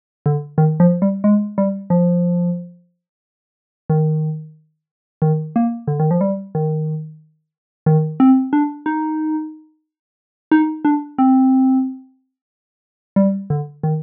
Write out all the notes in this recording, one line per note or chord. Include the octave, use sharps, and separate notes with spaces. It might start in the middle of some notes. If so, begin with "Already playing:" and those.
D3
D#3
F3
G3
G#3
G3
F3
D#3
D#3
A#3
D3
D#3
F3
G3
D#3
D#3
C4
D4
D#4
D#4
D4
C4
G3
D3
D#3